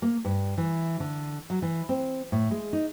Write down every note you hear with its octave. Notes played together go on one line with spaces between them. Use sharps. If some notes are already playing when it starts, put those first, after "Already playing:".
A#3
G2
E3
D3
F#3
E3
C4
A2
G#3
D#4